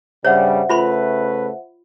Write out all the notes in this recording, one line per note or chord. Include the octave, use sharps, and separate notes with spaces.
G2 C#3 G3 C5 C#5 E5 F#5
C#3 A3 F4 B4 B5 C6